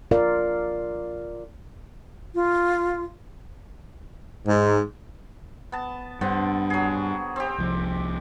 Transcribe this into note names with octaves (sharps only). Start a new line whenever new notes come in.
F4 A#4 D5 F5
F4
G#2
B3 A5
G2 D3 B3 C4
F#3 G#4
C4 G4
C2 F3